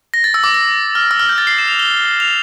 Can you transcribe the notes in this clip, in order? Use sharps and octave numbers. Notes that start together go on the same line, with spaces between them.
A#6
A6
E6
D6
E6
F6
E6
F6
G6
A6
C7
E7
F7
G7
F7